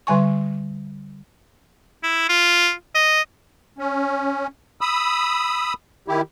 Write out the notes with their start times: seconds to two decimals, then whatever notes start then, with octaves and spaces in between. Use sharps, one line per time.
0.07 D3 G3 G#5 C#6
2.03 E4
2.29 F4
2.95 D#5
3.78 C#4
4.81 B5 D#6 E6
6.08 D#3 E4 G4